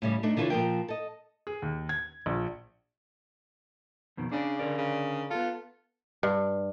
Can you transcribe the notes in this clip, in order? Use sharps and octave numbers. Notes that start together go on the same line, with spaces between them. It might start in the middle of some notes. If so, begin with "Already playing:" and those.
A2 C#3 G3
A3 D4 D#4
D3 E3 F4 G4 B4 C#5
A#2 F3 A#4 G5
A4 D#5
G#4
D#2
G#6
A#1
F2 B2 D#3
C#3 D4 C#5 D5
D3 A#4 D5
C#3
B3 F4 A4
G2